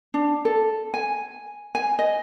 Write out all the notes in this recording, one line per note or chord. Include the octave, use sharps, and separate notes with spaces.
D4
A4
G#5
G#5
D#5